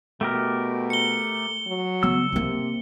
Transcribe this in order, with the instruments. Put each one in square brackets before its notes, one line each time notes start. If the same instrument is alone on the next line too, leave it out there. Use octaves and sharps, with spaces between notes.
[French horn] B2 [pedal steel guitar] A3 G4 A#4
[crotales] C#7 G7
[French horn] F#3
[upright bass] C#3 B3 [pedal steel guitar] E6
[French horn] C3 [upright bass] A#3 C4